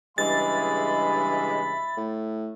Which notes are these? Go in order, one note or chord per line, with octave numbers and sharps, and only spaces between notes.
G2 C#3 E3 G#3 E5 B5 A6
A2